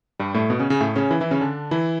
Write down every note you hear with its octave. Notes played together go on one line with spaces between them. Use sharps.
G2 G3
A2 A3
B2 B3
C#3 C#4
C#3 C#4
A2 A3
C#3 C#4
E3 E4
E3 E4
C#3 C#4
D3 D4
E3 E4